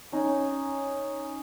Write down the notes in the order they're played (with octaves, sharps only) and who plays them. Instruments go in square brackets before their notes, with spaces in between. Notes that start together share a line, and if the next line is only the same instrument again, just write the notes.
[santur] C#4 D#4